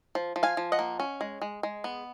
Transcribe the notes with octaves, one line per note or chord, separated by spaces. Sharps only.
F3
F3
F5 G#5
F3
D#5 F#5
A#3
C#4
G#3
G#3
G#3
B3